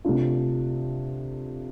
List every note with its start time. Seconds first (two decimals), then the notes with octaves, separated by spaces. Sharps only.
0.05 C3 A3 D4 F4